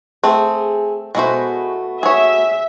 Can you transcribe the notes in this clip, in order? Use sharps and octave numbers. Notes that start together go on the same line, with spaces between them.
A3 C4 G#4
B2 G#3 A3 E4 F#4 C5
G#4 C#5 E5